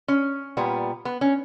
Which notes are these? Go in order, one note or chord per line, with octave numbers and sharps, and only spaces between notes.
C#4
A#2 G3 B3
B3
C#4